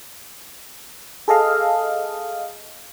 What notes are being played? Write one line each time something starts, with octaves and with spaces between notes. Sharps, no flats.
G#4 A4 D#5 F5